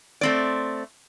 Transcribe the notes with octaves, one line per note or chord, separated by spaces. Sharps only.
A3 C4 D5